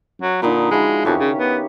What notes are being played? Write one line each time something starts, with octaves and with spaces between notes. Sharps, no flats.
F#3
A#2 D3 D#4 B5
F3 G#3 E4 F#4
F2 D#3 C#4 G4
C#3
B3